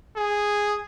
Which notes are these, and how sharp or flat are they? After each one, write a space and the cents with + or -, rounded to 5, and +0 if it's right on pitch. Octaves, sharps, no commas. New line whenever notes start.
G#4 -5